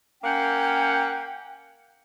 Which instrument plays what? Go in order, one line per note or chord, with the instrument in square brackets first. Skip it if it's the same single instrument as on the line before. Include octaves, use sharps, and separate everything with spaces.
[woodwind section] A#3 C#4 F#5 G5